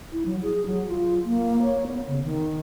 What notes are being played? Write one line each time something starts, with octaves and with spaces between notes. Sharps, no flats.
E4
F#3
G#4
F#3
F4
A#3
C#5
B3
C#3
D#3